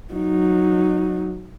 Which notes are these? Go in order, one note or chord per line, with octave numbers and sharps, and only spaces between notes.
F#3 D#4